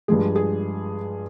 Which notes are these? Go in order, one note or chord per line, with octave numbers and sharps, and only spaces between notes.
G2 F3 G#3 G#4
G#4